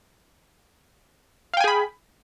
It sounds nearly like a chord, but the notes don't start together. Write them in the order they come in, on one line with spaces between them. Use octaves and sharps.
F5 G5 G#5 G#4 B5